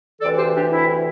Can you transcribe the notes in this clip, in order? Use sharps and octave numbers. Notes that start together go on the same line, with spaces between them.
D2 C3 E3 A4 D5
G4 C5
D4 G4
E4